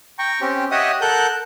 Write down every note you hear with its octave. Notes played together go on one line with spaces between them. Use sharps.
G5 A#5 C#6
C4 C#4 G4
G4 C#5 D#5 E5 F#5 D#6
A4 A#4 F#5 F#6 G6